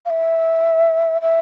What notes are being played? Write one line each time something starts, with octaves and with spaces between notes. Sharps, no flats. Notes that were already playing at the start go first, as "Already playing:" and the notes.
F5
E5
E5